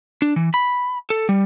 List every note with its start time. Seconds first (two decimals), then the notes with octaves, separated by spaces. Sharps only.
0.22 D4
0.36 E3
0.54 B5
1.10 A4
1.29 G3